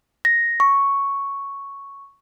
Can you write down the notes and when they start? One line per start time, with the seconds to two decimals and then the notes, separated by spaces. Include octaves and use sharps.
0.25 A#6
0.60 C#6